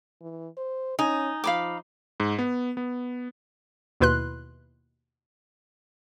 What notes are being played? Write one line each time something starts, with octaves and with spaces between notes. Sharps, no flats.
E3
C5
C#4 D#4 G#5
F3 F5 B5 D6
G#2
B3
B3
D#2 B2 E4 B4 C6 F#6